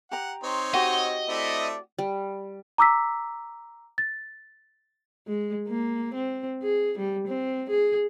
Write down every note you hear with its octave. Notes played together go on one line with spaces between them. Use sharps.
G4 F#5 A#5
C4 D#4 C#5 C6
F#4 G4 D#5 F#5
A3 C4 E4 D5
G3
A#5 D6 E6 B6
A6
G#3
A#3
C4
G#4
G3
C4
G#4